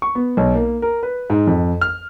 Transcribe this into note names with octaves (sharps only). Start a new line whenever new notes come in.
C#6
B3
B1
A#3
A#4
B4
G#2
F2
F6